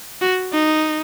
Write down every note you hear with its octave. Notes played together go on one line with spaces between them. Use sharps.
F#4
D#4